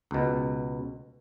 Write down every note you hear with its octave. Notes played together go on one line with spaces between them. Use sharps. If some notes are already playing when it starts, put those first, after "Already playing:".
C#2 B2